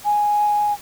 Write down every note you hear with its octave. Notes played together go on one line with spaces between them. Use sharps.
G#5